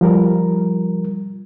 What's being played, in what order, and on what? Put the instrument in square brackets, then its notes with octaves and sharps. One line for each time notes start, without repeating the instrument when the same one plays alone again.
[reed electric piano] F3 G3 A#4